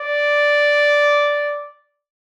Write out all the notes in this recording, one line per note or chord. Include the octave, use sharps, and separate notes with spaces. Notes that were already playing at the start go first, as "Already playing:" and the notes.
Already playing: D5